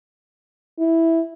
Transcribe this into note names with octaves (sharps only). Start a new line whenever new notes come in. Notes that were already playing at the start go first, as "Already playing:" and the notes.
E4